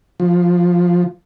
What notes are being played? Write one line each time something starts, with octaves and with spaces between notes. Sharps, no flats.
F3